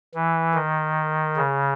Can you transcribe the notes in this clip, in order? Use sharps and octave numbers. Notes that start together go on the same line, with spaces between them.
E3
D#3
C#3